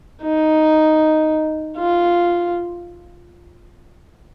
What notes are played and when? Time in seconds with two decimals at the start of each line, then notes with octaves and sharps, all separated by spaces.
0.23 D#4
1.78 F4